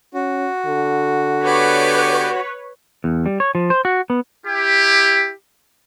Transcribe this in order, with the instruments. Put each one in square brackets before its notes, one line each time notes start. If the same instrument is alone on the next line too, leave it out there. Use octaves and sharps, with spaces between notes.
[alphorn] C#4 [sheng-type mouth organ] F#4
[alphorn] D3
[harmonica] B3 G4 D5 [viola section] B4 C#5
[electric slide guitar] E2
G3
C#5
F3
C5
F#4
B3
[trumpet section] E4 G4